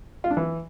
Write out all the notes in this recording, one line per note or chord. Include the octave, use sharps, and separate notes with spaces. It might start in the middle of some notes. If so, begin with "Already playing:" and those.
F4
D4
E3